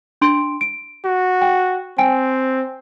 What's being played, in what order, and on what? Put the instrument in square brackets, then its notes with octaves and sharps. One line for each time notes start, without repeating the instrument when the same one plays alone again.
[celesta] D4 C6 D7
D7
[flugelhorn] F#4
[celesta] G5
[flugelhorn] C4 [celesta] G5 G#5 D7